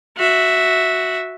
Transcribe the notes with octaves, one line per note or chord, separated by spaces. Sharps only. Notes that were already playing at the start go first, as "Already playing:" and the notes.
F#4 E5